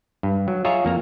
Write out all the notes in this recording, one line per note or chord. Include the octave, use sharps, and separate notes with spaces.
G2
F#3
F4 G#4 C#5 D#5 E5 A#5
F2 A#3 A#5